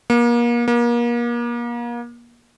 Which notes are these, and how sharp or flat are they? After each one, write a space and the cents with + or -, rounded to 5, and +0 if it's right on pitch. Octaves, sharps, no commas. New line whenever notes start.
A#3 +35
A#3 +35